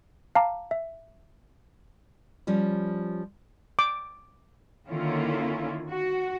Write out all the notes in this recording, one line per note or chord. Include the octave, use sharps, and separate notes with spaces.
F5 A5 A#5 D6
E5
F3 G3 C#4
D6
D3 D#3 A#3 C#4 E4 F4
F#4